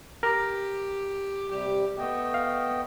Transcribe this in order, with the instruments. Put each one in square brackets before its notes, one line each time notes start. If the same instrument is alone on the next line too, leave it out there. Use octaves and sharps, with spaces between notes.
[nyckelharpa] G4 [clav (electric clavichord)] A#4
[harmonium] C3 G3 [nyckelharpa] G4
[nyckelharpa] A3 [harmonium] B3 D#5 G5
[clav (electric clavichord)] F5